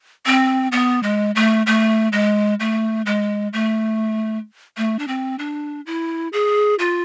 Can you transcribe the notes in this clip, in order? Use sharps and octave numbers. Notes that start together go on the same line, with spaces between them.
C4
B3
G#3
A3
A3
G#3
A3
G#3
A3
A3
D4
C4
D4
E4
G#4
F4